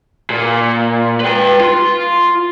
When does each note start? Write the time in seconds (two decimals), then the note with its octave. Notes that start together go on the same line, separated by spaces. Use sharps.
0.30 A#2
1.20 B4 G5
1.60 F4